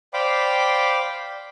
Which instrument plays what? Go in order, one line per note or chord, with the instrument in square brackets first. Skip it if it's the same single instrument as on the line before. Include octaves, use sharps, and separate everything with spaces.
[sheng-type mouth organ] C5 D5 F5 G5 B5 D6